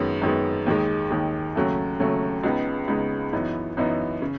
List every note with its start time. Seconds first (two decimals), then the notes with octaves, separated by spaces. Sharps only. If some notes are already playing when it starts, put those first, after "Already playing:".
Already playing: F#2 D#3 G#3 B3
0.22 F#2 D#3 G#3 B3
0.66 D#2 D#3 G#3
1.11 D#2 D#3 G#3
1.55 D#2 C#3 F#3 A3
2.00 D#2 C#3 F#3 A3
2.44 C#2 C#3 G#3 B3 D#4
2.88 C#2 C#3 G#3 B3 D#4
3.33 F#2 E3 B3 D#4
3.77 F#2 E3 B3 D#4
4.22 C#3